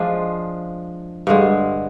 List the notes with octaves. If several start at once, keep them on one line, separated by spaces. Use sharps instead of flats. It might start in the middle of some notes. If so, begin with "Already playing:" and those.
Already playing: F3 G#3 D4 F4
G2 D3 G#3